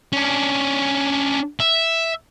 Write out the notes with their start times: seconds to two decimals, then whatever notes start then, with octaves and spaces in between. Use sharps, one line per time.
0.13 C#4 D4
1.60 E5